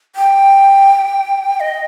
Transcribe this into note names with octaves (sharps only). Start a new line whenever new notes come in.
G5
D#5